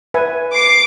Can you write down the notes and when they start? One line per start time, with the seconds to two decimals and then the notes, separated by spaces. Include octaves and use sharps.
0.14 B4 E5 G#5
0.54 D6 C7 D7